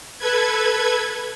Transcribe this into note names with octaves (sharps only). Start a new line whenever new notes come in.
A4 B4 G#6